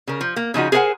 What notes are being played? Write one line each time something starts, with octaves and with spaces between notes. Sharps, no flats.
C#3 A#4
F3
A#3
C#3 F3 D#4 F#4
G#4 A#4 C5 F5 F#5 G#5